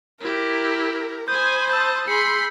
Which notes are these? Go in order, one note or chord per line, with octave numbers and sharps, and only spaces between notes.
E4 G4 A#4
C5 G#5 B5 D#6 G6
A5 D#6 E6 G6
G#4 B5 C6 C7 C#7